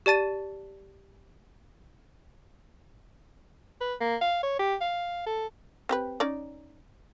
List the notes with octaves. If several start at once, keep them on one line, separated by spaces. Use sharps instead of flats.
G4 D5 A5 A6 D#7
B4
A#3
F5
C#5
G4
F5
A4
C4 G4 B4
C#4 D#4 D5